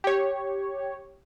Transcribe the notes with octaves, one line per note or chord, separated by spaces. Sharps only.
G4 C#5